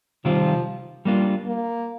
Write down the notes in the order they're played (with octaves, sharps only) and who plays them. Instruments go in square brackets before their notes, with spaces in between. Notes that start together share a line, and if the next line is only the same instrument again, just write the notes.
[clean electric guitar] C3 D#3 G3 C4 F4 [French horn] F3
[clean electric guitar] G3 A#3 D4 F4
[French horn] A#3